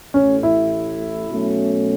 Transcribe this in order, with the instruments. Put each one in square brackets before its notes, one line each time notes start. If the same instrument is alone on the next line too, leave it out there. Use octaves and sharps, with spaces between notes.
[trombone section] A1 A2 A3 [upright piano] C#4
[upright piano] E4
[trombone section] B2 F#3 A3 C#4